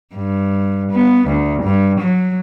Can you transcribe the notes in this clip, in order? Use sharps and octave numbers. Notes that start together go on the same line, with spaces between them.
G2
B3
D2
G2
F#3